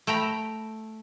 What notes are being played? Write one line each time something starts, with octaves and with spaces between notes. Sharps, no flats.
A3 G5 A#5 B5